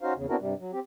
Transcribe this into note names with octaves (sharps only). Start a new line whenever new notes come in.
C#4 D#4 F#4 C5 F5
E2 C#3
B3 C4 D4 E4 F#4 A#4
G2 C3 G3
F#3
C4 G4